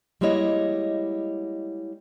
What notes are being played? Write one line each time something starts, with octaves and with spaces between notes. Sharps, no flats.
G3 G#3 A#3 E4 C#5 D#5